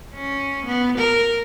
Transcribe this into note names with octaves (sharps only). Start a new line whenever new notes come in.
C#4
B3
A#4